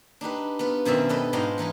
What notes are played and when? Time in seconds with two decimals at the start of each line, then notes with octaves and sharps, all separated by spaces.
0.21 D4 D#4 G4 B4
0.59 B3 F4 B4
0.85 F#2 B2 D#3 C4 D5 E5
1.09 G3 D4 A4 B4 D#5
1.33 G#2 D4 F4 D#5 G5 C6
1.58 E3 D#4 F4 B5